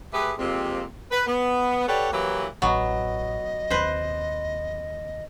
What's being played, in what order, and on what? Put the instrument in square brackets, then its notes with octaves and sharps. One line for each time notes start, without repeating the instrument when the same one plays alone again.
[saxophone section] A3 G4 G#4 B4
F2 C3 G#3 A#3 C4
B4
B3
G4 A4 B4 C#5 D5 F#5
E3 F#3 A#3 E4 G4 B4
[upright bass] A1 [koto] F#3 B3 [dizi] D#5
[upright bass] D#2 C4 [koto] B4 C5